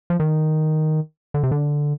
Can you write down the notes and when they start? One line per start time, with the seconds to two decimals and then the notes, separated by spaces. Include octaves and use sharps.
0.10 F3
0.20 D#3
1.34 D3
1.43 C3
1.52 D3